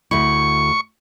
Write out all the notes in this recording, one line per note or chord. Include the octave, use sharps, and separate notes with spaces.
D2 E4 C#6